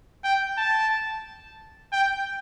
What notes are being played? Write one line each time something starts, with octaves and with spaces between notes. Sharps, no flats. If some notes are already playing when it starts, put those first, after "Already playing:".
G5
A5
G5